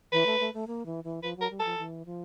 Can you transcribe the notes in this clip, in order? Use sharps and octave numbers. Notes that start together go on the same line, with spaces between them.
E3 B4
A3
A3
A3
A#3
E3
E3
F3 B4
F#3 A#4
G3
F3 A4
E3
F3